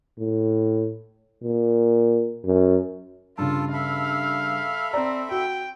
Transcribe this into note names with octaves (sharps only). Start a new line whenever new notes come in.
A2
A#2
F#2
G2 C#3 F4 A4 A5
A4 E5 F5 B5
C4 D5 A#5
F#4 G5